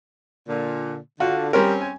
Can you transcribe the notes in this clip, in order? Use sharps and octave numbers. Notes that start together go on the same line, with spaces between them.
A#2 D3
D3 F4 F#4
G3 C4 C#4 A#4
G#5